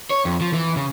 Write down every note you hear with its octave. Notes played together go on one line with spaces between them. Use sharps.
C#5
F2
F3
E3
C#3